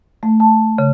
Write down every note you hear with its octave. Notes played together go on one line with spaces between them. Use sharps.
A3
A5
C#3